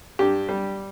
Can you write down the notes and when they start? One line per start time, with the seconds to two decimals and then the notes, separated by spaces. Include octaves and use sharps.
0.19 G2 G4
0.49 G3